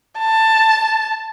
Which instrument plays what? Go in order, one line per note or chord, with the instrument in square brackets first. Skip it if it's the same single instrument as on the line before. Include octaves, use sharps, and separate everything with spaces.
[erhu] A5